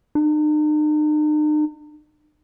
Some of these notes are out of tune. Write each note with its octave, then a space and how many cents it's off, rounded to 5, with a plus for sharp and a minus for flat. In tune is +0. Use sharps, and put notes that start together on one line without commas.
D#4 -45